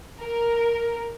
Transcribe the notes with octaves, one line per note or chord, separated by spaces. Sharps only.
A#4